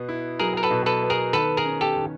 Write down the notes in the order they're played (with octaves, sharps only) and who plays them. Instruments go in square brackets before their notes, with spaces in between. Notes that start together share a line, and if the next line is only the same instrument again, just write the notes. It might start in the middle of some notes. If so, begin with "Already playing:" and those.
Already playing: [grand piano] B2 B3
E4
[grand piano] F#3 [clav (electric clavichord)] G#4 A#4
[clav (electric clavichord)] A#4
A4 B4
[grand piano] B2
[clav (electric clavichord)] A4 B4
[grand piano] B3
[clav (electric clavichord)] G#4 A#4
[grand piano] D#3 [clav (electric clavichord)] A4 B4
[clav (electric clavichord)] G#4 A#4
[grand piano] C#4
[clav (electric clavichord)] G4 A4
[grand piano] D#3